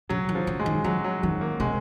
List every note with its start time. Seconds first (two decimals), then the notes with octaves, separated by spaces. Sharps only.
0.09 C#3 F#3
0.29 D#3
0.35 F3
0.47 C#3
0.59 G#3
0.66 D#3
0.84 F3 F#3
1.04 F#3
1.23 D#3 F#3
1.41 A#3
1.60 C3 G#3